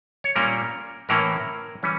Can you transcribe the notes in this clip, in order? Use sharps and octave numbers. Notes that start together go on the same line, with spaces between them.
C#5
A#2 G3 A#3 C#4 A#4
A2 E3 A#3 C#4 A#4
E3 G3 C#4